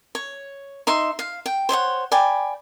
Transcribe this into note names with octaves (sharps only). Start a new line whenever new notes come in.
C#5
D#4 E5 C6
F5
G5
C5 C#5 E5 F#5
D5 G5 G#5 B5